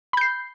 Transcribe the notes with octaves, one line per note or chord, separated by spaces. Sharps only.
B5 G6 C7